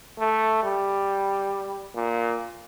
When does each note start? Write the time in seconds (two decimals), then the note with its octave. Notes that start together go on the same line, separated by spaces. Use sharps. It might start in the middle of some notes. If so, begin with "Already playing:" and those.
0.18 A3
0.63 G3
1.95 A#2